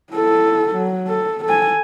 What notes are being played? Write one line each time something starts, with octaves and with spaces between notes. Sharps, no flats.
E4 A4
F#3
A4
A4 G#5